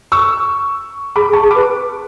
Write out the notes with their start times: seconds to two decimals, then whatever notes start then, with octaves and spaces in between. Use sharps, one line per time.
0.12 C#6 E6
1.16 G#4 B5 D6
1.29 G#4
1.33 A5 C#6
1.42 G#4
1.51 B4 B5 D6